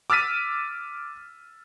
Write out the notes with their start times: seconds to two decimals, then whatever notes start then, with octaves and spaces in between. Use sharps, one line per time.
0.10 D6 E6 F6 A6 B6 D#7